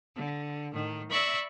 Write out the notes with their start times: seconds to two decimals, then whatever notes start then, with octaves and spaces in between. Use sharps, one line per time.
0.17 D3
0.73 A2 D#3
1.11 D5 E5 B5 C#6 E6 A#6